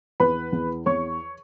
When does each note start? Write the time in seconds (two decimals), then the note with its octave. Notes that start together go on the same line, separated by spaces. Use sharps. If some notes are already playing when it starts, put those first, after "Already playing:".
0.20 E2 B4 B5
0.52 E2
0.86 E2 C#5 C#6